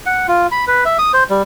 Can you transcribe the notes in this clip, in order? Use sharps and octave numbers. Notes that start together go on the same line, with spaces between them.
F#5
F4
B5
B4
E5
D#6
C5
G3